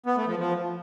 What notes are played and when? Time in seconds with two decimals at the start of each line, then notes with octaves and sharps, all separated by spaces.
0.06 B3
0.17 A3
0.27 F3
0.37 F3